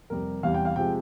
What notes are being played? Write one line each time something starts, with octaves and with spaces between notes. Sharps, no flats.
F2 C3 G3 A#4
E2 C3 G3 F5
G5
F5
C3 F3 G#3 G5